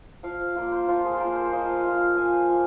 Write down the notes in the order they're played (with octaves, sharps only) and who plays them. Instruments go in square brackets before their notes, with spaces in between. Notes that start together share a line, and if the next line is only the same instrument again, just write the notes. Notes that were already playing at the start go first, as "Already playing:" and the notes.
[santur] F3 F5
A#3 F4
C5
F3 F4
G#4
C5
A#3 F4 A#4
C5
F3 D#5
F5
A#3 F4 F5
A#5
F3 G#5
A#3 F4